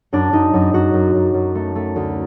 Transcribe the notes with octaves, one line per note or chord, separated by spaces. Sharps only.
F#2 D4
F#2 D#4
F#2
F#2 F#4
F#2
F#2
F#2
A3
A3
D2